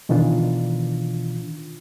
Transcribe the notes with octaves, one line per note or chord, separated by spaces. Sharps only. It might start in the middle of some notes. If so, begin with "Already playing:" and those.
B2 D#3 E3 D4 F4